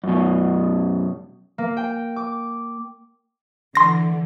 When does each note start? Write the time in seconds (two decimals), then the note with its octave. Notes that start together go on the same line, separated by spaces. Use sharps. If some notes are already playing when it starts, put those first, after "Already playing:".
0.04 F#2 B2
1.58 A#3
1.77 G5
2.16 D6
3.75 D3 E3 C6 A#6